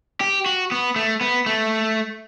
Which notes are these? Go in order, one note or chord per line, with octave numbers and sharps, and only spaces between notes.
G4
F#4
B3
A3
B3
A3